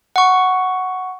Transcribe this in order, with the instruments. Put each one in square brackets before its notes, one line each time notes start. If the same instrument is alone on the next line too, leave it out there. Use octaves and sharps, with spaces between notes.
[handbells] F#5 C#6